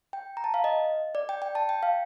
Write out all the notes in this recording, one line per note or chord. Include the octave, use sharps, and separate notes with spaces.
G5
A#5
A5
F5
D#5
D5
G5
G5
A5
G5
F5